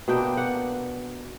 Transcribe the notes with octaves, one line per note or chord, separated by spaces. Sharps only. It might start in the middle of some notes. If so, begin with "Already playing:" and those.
B2 A#3 D4 G5
F#5